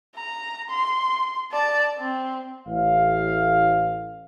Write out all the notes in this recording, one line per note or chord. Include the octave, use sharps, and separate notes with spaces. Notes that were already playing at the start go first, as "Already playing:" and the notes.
A#5
C6
D5 A5
C4
A1 F5